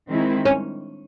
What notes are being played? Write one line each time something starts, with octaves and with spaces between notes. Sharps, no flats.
D#3 G#3 C4 E4
C#4